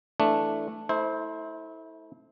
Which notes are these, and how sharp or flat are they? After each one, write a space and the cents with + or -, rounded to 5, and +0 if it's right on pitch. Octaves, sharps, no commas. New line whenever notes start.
E3 +0 A3 +0 D4 +0
A3 +0 E4 -30 C5 +10